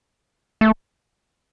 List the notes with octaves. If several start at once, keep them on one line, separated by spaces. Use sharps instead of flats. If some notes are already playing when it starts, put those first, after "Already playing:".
A3